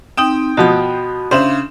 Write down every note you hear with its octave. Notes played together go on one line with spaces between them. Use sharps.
C4 D#4 G5 D#6
B2 F3 F#4 B5
C#3 D4 E4 C5 F5 E7